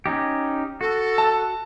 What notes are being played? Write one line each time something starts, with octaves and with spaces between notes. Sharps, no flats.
C#4 D#4 G4
F#4 A4
A5